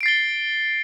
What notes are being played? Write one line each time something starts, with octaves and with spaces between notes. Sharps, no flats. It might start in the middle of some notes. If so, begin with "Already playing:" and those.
A6 C7 D7 G7